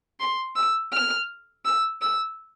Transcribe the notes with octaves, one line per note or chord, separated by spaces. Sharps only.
C6
E6
F6
E6
E6